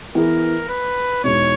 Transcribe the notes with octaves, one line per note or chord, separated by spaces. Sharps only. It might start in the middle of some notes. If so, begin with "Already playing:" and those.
E3 B3 E4 G#4 A#4
B4
E2 B2 G#3 D#4 C#5